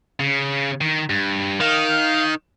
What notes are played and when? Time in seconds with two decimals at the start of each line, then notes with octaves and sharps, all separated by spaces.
0.20 C#3
0.81 D#3
1.10 G2
1.61 D#3 F5